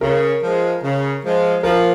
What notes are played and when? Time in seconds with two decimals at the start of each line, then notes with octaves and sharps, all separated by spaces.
0.01 C#3 A#4
0.42 F3 G#3
0.82 C#3
1.23 F3 G#3
1.63 F3 A#4